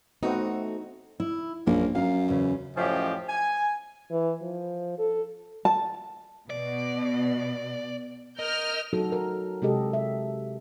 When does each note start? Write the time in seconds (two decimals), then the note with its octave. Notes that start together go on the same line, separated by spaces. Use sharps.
0.23 A3 B3 C4 D#4 F#4
1.20 E4
1.66 A#1 F#2 A#3 A#4
1.95 F#2 F5 A#5
2.28 E2 C#3
2.77 F#2 A2 F3 C#4 G4 D#5
3.29 G#5
4.11 E3
4.42 F3
4.99 A4
5.65 A5
6.50 B2 D5
8.39 A#4 D#5 F6 G6
8.93 F#3 D#4 F#4 A4
9.12 A#4
9.62 C3 G#3 G4 A4 D#5
9.91 G4 E5